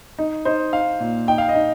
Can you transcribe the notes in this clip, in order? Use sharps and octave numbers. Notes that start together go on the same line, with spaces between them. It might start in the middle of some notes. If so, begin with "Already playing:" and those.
D#4
D#4 C5
D#4 F5
A#2
D#4 G5
F5
D#5
D#4